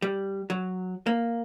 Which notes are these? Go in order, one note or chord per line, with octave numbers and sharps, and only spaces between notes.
G3
F#3
A#3